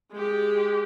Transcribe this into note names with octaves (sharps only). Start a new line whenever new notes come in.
G#3 G4